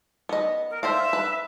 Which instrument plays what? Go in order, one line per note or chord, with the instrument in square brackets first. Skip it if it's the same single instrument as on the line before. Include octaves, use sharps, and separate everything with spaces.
[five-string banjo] B3 D#5
[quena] A#4
[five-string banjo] C5 D5 F5 [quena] E5
[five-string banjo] B4